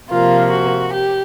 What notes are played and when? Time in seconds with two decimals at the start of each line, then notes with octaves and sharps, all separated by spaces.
0.10 C3 F3 A#3 F4
0.52 F#4
0.94 G4